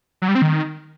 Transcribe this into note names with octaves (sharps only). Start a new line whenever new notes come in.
F#3
G3
C4
D#3